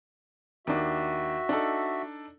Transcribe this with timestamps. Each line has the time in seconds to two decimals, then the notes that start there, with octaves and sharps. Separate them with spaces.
0.67 D#2 D4 F#4 E5
1.49 D4 D#4 A4